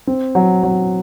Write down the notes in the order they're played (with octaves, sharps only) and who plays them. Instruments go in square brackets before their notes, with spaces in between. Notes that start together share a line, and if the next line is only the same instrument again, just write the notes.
[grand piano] C4
F#3
F#3